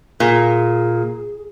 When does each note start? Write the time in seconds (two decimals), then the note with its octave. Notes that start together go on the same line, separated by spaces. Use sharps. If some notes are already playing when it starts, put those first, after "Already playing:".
0.20 A#2 G#4